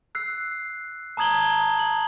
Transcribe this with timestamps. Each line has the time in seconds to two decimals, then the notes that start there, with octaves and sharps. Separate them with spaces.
0.15 E6 F#6 C7
1.17 A5 A#5 D#6 G#6 F#7 G7
1.79 F#7